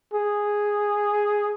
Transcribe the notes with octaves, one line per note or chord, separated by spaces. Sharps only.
G#4